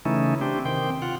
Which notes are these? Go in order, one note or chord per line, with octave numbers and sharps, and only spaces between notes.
C#3 E3 A3 C#4 D#4 E4
C4 D4 G4
C3 D#3 C4 G5
F4 F#5